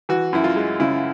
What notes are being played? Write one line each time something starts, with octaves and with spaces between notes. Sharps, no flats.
E3 F#4
F#2 E4
F4
G#3
C#3 E4